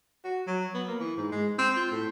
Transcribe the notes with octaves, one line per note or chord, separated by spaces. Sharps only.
F#4
F#3
B3
A#3
E3
G#2
G#3
C4
F4
A2